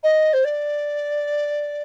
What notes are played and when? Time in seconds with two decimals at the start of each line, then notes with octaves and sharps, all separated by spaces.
0.03 D#5
0.33 C5
0.44 D5